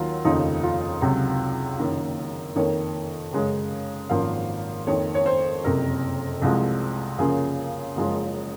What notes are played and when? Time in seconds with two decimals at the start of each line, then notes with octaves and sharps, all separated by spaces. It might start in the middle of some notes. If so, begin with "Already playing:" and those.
Already playing: D#2 D#3 F#3 A#3 F4
0.25 F1 D#2 C#3 F3 D#4
0.63 F4
1.02 C#2 C3 F#3
1.79 F#1 F#2 D#3 A#3
2.56 F2 D#3 A#3 C#5
3.33 F#2 C#3 G#3
4.10 G#1 F#2 F3 A#3 F5
4.87 F2 D#3 A#3 C#5
5.15 C#5
5.26 C5
5.64 F#1 F2 C3 A#4
6.42 C2 C3 F3 G#3
7.18 F#2 C#3 F3 A#3 G#4
7.96 F#1 F#2 F3 G#3